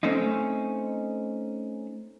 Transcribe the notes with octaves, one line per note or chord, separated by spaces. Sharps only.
A3 C4 C#4 D#4